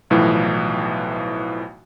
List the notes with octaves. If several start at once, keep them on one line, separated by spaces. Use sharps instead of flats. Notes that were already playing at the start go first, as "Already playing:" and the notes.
B1 A2 E3 F3